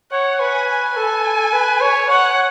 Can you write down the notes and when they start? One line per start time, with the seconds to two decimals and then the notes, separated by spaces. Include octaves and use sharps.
0.11 C#5 F#5
0.40 B4 G#5
0.96 A4 G#5
1.53 B4
1.81 C#5
2.09 C#5 F#5